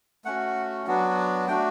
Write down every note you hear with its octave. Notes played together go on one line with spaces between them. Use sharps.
A3 C#4 F#4 F#5
F#3 B3 D4 F#4
A3 D4 F#4 G5